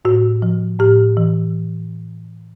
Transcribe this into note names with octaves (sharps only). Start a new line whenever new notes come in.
A2 F#4
F3
A2 G4
E3